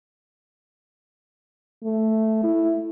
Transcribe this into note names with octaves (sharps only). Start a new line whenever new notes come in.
A3
E4